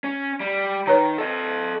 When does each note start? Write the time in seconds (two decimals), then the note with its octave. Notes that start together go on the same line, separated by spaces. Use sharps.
0.04 C#4
0.40 G3
0.87 D#3 B4 C#5 A#5
1.18 A4 D#5